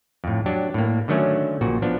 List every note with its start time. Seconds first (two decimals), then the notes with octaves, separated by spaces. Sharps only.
0.24 F2 A2
0.46 F#3 D4 G4
0.74 A2 A#3
1.08 D3 D#3 F#3 A3 C#4
1.61 A#1 A#2 F#4
1.82 F3 B3 D4